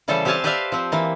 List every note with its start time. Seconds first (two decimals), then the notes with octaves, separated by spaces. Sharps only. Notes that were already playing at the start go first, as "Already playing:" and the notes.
0.08 C#3 E3 G3 A4 C5
0.25 C4 G4 C5 F5 G#5 A5
0.44 G4 B4 C5 D5 E5 F5
0.72 F3 C4
0.92 E3 A#3